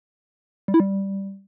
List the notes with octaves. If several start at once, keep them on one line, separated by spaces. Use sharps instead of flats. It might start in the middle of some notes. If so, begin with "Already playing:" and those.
G3
E4
G3